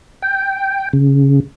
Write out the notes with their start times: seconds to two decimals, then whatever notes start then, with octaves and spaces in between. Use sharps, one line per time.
0.22 G5
0.93 C#3